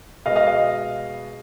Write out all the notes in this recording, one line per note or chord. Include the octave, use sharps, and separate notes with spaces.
B2 G#3 B3 D#5 F5
D#5 F5
D#5 F5